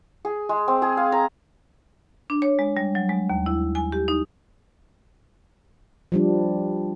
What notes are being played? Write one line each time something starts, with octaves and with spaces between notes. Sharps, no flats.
G#4
G#3
C4
G#4
F5
A#5
D4
C#5
G#3
G3
F#3
G#3
D#2
E4
G#5
G4
D#4
F3 G3 D4